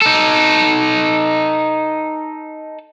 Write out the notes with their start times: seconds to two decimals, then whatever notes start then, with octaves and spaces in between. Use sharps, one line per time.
0.02 D#4 A4